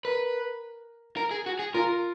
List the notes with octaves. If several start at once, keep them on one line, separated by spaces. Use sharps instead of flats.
A#4 B4
A#4
G#4
F#4
G#4
F4 A#4